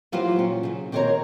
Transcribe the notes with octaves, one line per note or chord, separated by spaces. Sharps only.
E3 F#3 F4 G4 C5
A#2 C#4
C#3 F#3
D#3 C4 G4 A#4 C#5 A#5